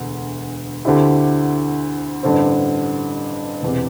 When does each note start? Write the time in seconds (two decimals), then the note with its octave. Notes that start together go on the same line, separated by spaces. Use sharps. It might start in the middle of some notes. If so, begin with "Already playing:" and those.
Already playing: E1 D2 D3
0.85 D2 D3 C4 E4 G4
2.23 A1 G2 D3 C4
3.62 E1 E2 C3